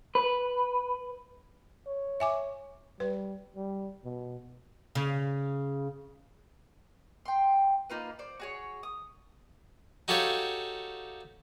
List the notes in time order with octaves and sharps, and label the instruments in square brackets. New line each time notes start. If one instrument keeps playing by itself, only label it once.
[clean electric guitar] B4
[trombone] C#5
[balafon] E5 G#5 D6
[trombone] G3 [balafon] B4
[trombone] G3
B2
[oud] C#3
[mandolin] G5 C6
A#3 D#4 F4 B4
C5 D5
F#4 G#4 C#5
D#6
[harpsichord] D#4 F#4 G4 A4 C#5 F5